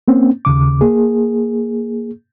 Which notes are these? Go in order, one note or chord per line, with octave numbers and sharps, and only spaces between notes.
A#3 C4 C#4
D#2 C#3 D6
A#3 G#4